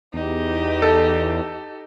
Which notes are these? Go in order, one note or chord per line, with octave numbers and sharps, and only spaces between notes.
E2 D#4 G4
A4